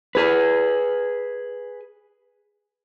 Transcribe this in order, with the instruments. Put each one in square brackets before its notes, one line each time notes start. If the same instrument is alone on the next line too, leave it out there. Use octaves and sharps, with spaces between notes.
[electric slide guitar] G#4 B4